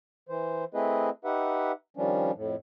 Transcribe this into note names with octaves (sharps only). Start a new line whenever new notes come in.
E3 C5
A3 C4 E4 G#4 B4 D#5
D#4 G4 B4 E5 F#5
D#3 F3 G3 C#4 D4
F2 A2